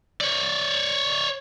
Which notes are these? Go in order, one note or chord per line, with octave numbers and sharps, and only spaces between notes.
C#5 D5